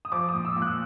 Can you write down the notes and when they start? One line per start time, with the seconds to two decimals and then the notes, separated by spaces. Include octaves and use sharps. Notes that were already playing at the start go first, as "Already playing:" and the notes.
0.05 D#6
0.12 F3 D6
0.29 D#6
0.34 A#2
0.45 E6
0.56 A#2
0.62 F#6